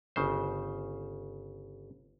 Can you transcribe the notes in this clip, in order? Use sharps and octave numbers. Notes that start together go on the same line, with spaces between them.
G1 C#3 C5